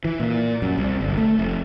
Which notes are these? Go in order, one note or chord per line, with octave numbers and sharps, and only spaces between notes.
E3
A#2
F#2
C2
G1
A3
F1